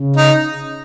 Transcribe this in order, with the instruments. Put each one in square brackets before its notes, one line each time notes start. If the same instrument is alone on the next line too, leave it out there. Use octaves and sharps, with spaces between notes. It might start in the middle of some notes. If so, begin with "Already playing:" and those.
Already playing: [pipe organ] C#3
[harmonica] D#4